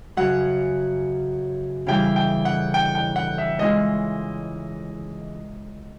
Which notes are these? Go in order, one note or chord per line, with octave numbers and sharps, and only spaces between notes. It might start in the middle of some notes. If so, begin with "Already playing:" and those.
F#2 C#3 F#3 F#5
C#3 E3 G3 G5
G5
F#5
G5
G5
F#5
E5
E3 G#3 C#4 F4 D#5